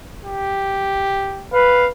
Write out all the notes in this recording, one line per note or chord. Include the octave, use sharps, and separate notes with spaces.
G4
B4 F5